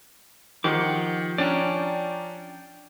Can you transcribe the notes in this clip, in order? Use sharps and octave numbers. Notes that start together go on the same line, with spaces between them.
D#3 F3 G4 C5 F#5 G5 D6 G6
C#4 D4 D5 G5 A#5